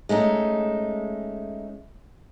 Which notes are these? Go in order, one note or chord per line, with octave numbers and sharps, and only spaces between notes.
G#3 A3 C#4 D#4